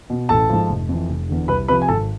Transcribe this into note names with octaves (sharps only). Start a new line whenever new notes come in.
B2
A1 A4 A5
G#2 F3
F1
F2 E3
F1
E2 D3
C2 B4 B5
C3 F3 B4 B5
G#5
G#1 A4 A5